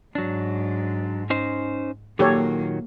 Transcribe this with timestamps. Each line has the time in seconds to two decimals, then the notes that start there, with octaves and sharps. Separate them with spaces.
0.15 G#2 F#3 D4
1.30 C#4 D#4 C5
2.19 A#2 D#3 F#3 A#3 G4 A4 C#5